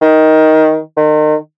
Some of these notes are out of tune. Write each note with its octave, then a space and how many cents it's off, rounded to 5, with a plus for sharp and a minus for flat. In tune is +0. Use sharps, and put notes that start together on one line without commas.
D#3 +10
D#3 -35